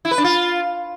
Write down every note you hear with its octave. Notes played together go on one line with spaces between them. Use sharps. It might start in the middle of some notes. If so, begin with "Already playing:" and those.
E4
B4
D4
F4